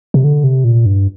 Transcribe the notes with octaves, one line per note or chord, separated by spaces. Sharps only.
C3
D3
C3
A#2
G2